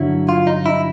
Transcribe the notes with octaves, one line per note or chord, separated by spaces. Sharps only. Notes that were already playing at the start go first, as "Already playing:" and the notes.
Already playing: G2 D3 F#3 E4
F4
D#4
E4